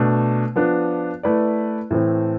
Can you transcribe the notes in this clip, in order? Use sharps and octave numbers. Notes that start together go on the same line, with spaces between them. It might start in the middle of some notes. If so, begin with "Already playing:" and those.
Already playing: B2 A3 D4
F3 B3 D4
A3 E4 B4 D5
A2 E3 A3 C4